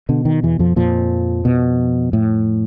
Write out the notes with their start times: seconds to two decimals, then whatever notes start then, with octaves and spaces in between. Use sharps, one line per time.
0.09 B2 D3
0.25 D#3
0.43 E2 E3
0.59 F2 F3
0.76 F2 A#2 F3
1.45 B2
2.13 A2